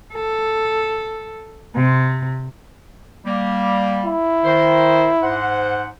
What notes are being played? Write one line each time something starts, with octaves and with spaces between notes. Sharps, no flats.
A4
C3
G3 A#3
E4
D#3 C5
G#2 C5 F#5